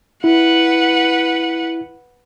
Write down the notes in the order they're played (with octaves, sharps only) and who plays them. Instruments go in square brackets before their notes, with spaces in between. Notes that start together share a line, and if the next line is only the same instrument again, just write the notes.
[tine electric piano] E4 [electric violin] B4 F#5